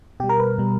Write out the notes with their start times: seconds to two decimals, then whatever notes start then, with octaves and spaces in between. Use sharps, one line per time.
0.20 B2 G4
0.24 G3
0.29 A#4
0.40 B4
0.58 B2 G3